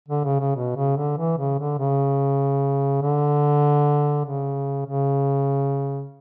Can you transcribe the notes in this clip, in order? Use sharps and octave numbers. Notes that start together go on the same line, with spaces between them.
D3
C#3
C#3
B2
C#3
D3
E3
C#3
D3
C#3
D3
C#3
C#3